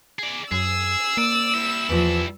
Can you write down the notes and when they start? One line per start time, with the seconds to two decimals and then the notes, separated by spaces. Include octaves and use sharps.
0.19 G#4 D5
0.52 F#2 G#4 E6
1.17 A#3 D5
1.55 G3 E4
1.89 E2 F3